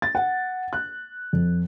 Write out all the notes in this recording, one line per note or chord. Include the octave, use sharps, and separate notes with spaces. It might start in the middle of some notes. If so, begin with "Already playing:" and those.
A6
F#5
F#6
F2